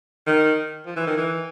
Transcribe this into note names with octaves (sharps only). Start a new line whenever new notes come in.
D#3
F3
E3
D#3
E3